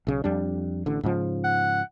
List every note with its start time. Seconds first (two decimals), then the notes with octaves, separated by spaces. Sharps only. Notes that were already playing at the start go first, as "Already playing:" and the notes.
0.07 B1 C#3
0.24 F2 G3 D4
0.86 A1 D3
1.03 G#2 C#3 F3
1.44 F#5